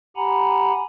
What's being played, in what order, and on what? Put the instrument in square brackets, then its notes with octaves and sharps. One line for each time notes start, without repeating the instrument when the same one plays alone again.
[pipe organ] G4 F#5 G#5 A#5 B5